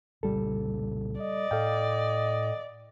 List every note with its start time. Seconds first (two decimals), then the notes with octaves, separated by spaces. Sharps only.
0.23 C2 A#2 C#3 G3 A4
1.21 D5 D#5
1.51 A2 A4 F5 G5